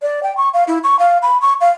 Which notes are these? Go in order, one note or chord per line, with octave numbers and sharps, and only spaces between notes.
D5
G5
C#6
F5
E4
C#6
F5
B5
C#6
F5